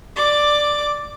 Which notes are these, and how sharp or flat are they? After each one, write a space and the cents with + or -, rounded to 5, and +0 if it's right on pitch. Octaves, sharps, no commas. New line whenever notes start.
D5 +5 D6 +0